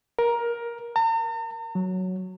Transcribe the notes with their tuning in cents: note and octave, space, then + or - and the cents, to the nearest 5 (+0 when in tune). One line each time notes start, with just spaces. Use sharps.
A#4 +15
A#5 -45
F#3 +0